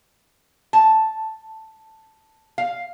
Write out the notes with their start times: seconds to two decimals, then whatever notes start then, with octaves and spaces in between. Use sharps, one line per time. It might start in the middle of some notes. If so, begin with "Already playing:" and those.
0.73 A5
2.58 F5